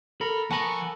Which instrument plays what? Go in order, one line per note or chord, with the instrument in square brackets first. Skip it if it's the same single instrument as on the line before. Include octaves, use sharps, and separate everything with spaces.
[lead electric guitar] A4 [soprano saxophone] A#4 [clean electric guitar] B5
[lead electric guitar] F3 G#5 [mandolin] A4 A#4 [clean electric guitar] F#5 B5 [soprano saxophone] C#6